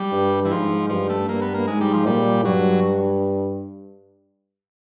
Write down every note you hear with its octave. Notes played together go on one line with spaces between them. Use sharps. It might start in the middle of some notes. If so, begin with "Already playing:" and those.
Already playing: G3
G2
E3
G#2 F3
G2 F3
A3
G2 A#3
B3
A#3
G#2 G#3
G3
F3
A#2 G3
G2 F#3